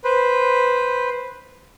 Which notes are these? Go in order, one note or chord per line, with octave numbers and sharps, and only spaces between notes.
B4 C5